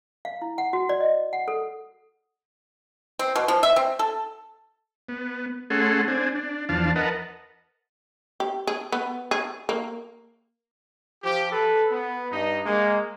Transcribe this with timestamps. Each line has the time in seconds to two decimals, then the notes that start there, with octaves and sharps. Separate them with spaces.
0.25 F5
0.42 E4
0.58 F#5
0.73 F#4
0.89 D5
1.01 D#5
1.33 F#5
1.48 A4
3.19 C4
3.36 B2
3.48 F3
3.63 E5
3.76 C4
3.99 A4
5.09 B3
5.70 A3 C#4 G#4 A4 F#5 C6
6.08 C4 D4 G#5
6.35 D4
6.69 E2 F3 D4 F5 A5
6.96 A#4 B4 D#5 F#5 A5
8.40 G4
8.67 G#4
8.92 B3
9.31 G#4
9.69 A#3
11.23 F3 G4
11.52 A4 B4
11.92 B3
12.32 G2 D#4
12.66 G#3 A#3